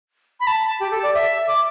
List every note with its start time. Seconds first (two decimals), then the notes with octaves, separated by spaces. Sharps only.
0.40 B5
0.47 A5
0.80 G4
0.91 A4
1.03 D5
1.14 E5
1.48 D6